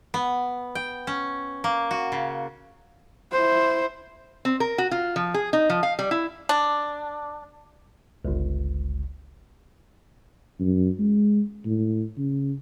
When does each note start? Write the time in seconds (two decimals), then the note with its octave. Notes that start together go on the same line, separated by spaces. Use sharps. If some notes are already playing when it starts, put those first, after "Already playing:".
0.14 B3
0.75 G5
1.07 C#4
1.64 A#3
1.91 F#4
2.12 C#3
3.31 E4 C5
4.45 C4
4.60 A#4
4.78 F#4
4.91 F4
5.16 F3
5.34 G#4
5.53 D#4
5.70 F3
5.83 F5
5.99 G3
6.11 E4
6.49 D4
8.25 G1 C#2
10.59 F#2
10.99 G#3
11.65 A2
12.17 C#3